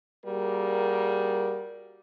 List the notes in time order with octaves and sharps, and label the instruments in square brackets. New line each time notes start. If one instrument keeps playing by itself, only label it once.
[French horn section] G3 A#3 F#4 G#4 A#4